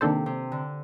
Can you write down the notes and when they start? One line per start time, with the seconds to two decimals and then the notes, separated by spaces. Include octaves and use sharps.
0.01 C3 D#3 A#3 D4 A4 C5
0.26 C3
0.52 D3